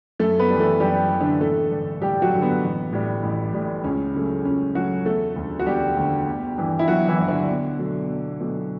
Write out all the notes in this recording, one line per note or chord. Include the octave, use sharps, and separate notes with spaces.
F#2 A3 A4
B3 B4
E3 G3
A3 A4
F#2 G3 G4
E3 G3
D3 D4
A1 A3 A4
G2 D3
A1 G3 G4
F#3 F#4
G2 D3
B3
A1
A2 G3
A1
A2 G3
C#2 C#4
C#3 F#3 A3
C#2 C#4
C#3 F#3 A3 F#4
E1 A3 A4
D2 D3
F#4
E1 G3 G4
D2 D3
G1
G2 E3
E4
G1 F#3 F#4
E3 E4
G2 E3
D3 D4
B1
B2 F#3 A3
B1
B2 F#3 A3